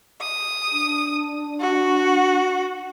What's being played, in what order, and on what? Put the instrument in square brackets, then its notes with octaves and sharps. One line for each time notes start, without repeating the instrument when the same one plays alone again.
[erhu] D#6
[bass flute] D4
[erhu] F#4